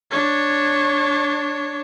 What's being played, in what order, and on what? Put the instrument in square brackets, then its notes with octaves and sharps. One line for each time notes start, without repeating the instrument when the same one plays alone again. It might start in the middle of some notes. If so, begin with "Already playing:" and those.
[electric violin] D4 C#5